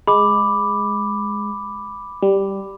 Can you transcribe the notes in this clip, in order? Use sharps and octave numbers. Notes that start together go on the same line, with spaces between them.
G#3 B5 D6
G3